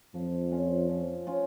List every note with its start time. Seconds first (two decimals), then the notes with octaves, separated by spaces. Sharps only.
0.14 F2 F3
0.52 C#4 F4
0.90 F3
1.27 C#4 F4